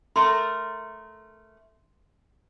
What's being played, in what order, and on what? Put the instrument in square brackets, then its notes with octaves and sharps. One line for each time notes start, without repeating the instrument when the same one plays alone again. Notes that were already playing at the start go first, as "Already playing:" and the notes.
[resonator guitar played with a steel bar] A3 A#4 [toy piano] C6